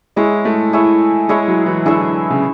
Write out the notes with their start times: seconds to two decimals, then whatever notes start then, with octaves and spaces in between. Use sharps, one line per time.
0.16 G#3 E4 G#4 C#5 E5
0.45 A3
0.73 E4 G#4 C#5 E5
1.29 G#3 E4 G#4 C#5 E5
1.48 F#3
1.66 E3
1.85 D3 E4 G#4 C#5 E5
2.30 C#3